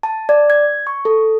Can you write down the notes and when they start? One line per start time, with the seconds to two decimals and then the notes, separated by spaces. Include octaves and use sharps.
0.03 A5
0.29 D5
0.50 G#6
0.87 C#6
1.05 A4